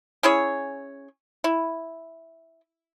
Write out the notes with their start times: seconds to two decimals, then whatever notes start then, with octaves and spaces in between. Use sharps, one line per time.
0.23 C#4 E4 G#4 C#5
1.44 E4